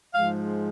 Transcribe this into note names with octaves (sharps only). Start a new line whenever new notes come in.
G#2 F3 G#3 F5